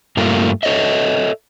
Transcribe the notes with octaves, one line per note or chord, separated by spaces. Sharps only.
G2 A3 A#3 F4
A4 C#5 D#5 E5